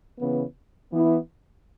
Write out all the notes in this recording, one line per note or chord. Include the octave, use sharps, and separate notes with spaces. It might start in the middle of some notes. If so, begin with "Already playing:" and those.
C#3 E3 B3
E3 B3 E4